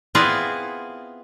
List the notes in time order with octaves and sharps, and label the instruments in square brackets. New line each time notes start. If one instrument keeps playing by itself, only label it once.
[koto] B3 C4 E4 F4 G#4 D5